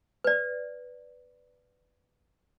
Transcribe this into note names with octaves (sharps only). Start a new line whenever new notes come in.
B4 D5